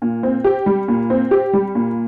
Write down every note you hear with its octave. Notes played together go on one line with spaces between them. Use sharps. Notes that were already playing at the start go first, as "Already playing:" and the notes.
A#2
C4
G4
G3
A#2
C4
G4
G3
A#2